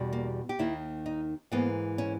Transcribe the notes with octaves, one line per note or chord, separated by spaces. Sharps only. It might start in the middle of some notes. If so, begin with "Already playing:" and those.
Already playing: E2 B2 G3
A#3
G4
D#2 D#3 A#3 E4
D#4
G#2 E3 A#3 B3
C#4